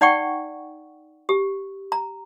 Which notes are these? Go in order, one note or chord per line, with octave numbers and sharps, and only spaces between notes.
D#4 D5 F#5 G5 C#6
G4
A#5